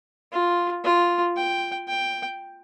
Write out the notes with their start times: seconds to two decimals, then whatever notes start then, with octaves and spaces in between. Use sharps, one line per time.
0.32 F4
0.84 F4
1.37 G5
1.88 G5